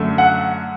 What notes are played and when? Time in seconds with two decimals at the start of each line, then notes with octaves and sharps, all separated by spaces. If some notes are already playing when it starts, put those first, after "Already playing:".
Already playing: F#2 D3 A3
0.18 F#5